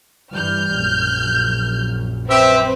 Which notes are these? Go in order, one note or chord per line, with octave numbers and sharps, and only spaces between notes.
G2 E3 G3 F6 G6
A#1 F#2
C4 G4 B4 E5